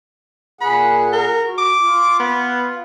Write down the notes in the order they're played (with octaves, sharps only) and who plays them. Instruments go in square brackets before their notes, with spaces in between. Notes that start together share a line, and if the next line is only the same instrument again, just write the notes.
[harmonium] A#2 G#4 F#5 [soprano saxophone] B5
[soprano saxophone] A#4
[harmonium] F#4
[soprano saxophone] D6
[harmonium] F4
[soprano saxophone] B3